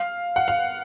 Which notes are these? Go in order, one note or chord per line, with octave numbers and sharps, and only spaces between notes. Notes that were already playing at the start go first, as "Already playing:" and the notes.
Already playing: F5
F#5
F5